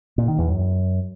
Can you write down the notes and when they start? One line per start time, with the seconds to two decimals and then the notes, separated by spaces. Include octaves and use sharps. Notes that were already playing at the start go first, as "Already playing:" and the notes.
0.18 A#2
0.28 D#3
0.38 E2
0.49 F#2